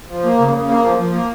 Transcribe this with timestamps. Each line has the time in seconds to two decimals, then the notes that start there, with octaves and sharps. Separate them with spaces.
0.09 F3
0.24 A#3
0.38 C#3
0.54 C#3
0.69 A#3
0.83 F3
0.98 F3
1.13 A#3